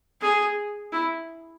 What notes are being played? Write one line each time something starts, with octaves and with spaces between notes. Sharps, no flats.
G#4
E4